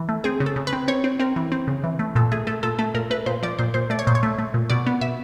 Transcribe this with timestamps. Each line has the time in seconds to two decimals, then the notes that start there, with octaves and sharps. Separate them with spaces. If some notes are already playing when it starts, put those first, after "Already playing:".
Already playing: E3
0.09 A3
0.24 C4 G#4
0.40 C#3
0.46 A4
0.56 C#3
0.67 B4
0.73 C4
0.88 C4 C#5
1.04 C4
1.20 C4 A#4
1.36 E3
1.52 C4
1.68 C#3
1.84 E3
1.99 A3
2.15 A#2 A4
2.32 A3 G#4
2.47 A3 A4
2.63 A#2 A4
2.79 A3 A4
2.94 A#2 A#4
3.10 A3 B4
3.26 A#2 C5
3.43 F3 D5
3.59 A#2 C5
3.74 A#2 C5
3.90 A3 D5
3.99 C#5
4.07 A#2 C5
4.15 C#5
4.23 A3
4.39 A3
4.54 A#2
4.70 B2 D5
4.87 B3
5.01 B2 E5